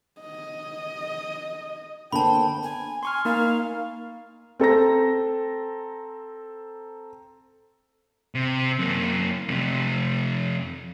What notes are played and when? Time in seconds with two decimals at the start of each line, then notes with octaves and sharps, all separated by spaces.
0.21 D#5
2.13 D3 A#3 B3 C5 G5 A5 B5
2.63 G#5
3.03 G#5 C6 C#6 F6
3.25 A#3 D#4 A#4 F5
4.60 C4 A4 A#5 A#6
8.35 C3
8.79 F#2 A#3
9.48 F2 C3